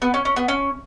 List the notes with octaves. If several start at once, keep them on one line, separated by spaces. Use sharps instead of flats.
B3
C#4
C#4
B3
C#4